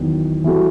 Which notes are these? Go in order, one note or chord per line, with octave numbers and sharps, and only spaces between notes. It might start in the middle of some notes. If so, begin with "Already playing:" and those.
Already playing: E2 D#3 F#3
E3 G3 C4 F#4 A4